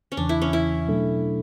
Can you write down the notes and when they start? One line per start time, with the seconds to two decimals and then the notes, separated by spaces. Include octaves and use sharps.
0.12 C#4
0.17 E2 C#3 E3 D4
0.29 E4
0.42 C#4
0.53 E4
0.88 B2 F#3 A3 D4 A4